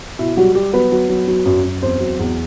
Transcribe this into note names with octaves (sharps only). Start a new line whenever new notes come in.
B2 E4
F#3 G3 F#4
G3 G4
F#3 B3 B4
F#3
F#3
F#3
F#2
F#2
E2 C4 C5
F#3
E2